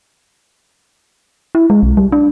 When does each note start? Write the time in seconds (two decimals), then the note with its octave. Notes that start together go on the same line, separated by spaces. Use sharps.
1.55 E4
1.70 G#3
1.83 B1
1.97 G3
2.12 D4